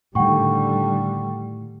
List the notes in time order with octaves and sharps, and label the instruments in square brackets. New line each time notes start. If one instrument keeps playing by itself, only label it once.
[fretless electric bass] A2 D#3 [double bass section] D3 G3 [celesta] F#5 G5 C#6